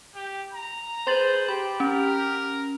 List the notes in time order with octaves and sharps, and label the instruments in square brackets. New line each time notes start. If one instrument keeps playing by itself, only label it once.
[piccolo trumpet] G4
A#5
[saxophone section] G#4 B4 C5 [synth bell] C6 A6 F#7
[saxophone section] G4 [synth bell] B5
[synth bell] C#4 [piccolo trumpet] A#4